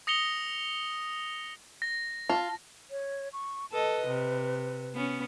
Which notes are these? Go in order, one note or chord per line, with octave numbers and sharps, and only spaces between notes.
D#6 A#6 C#7 F7 G7
A#6
F4 A5
C#5
C#6
A4 B4 D#5
C3
B3 C#4